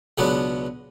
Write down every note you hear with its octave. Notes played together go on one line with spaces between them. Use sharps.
C#2 B2 F#3 B3 D4